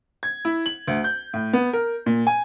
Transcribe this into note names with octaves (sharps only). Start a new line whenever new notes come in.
G#6
E4
F#7
D2
G6
A2
B3
A#4
A#2
G#5